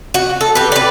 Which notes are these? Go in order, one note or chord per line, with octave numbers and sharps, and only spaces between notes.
F#4
A4
G4 B4
B4 D5